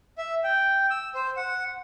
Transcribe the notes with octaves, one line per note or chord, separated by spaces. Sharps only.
E5
G5
E6
C5
F#5